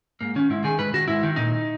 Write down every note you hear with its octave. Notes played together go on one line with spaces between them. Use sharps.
G#2 A#3
D#3 C#4
G#2 E4
D#3 G#4
G#2 B4
D#3 F#4
G#2 E4
D#3
A#2 D#4